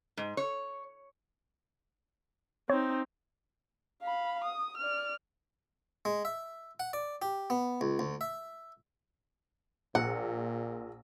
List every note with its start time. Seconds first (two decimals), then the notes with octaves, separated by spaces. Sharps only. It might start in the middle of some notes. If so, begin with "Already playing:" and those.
0.17 G#2
0.37 C#5
2.70 C4 D#4 C#5
4.02 F5 B5
4.44 D#6
4.78 D5 F6
6.05 G#3
6.25 E5
6.80 F#5
6.93 D5
7.22 G4
7.50 B3
7.81 C#2
7.99 D2
8.21 E5
9.95 A#1 A#2 F#5